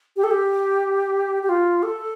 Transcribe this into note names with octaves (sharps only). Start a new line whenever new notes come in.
G4
A4
G4
G4
F4
A4